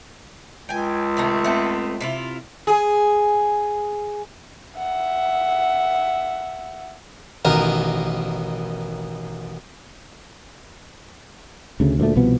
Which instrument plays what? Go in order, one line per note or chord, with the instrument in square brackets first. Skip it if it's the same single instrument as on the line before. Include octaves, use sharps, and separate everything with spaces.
[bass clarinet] C#2 [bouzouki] G5 G#5
[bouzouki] C3 D#3 A3
A3 B3 C4
C3 E4 F4
[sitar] G#4
[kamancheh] E5 F#5
[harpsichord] A1 B2 D#3 A#4
[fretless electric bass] D2 C#3 A3
D2 A#2 F#3 A3
C2 B2 F3 B3